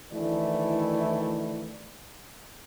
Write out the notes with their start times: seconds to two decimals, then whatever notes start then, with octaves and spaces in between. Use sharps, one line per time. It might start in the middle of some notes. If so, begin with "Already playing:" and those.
0.12 D2 D#3 E3 A3 E4 D5